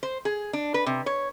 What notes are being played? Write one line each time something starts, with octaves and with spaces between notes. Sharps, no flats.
C5
G#4
D4
B4
C3
C#5